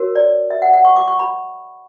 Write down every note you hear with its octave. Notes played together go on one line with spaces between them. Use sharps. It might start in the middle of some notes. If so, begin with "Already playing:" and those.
Already playing: F#4 A#4 C#5
D5
E5
F#5
F#5
C#6
D6
C#6
B5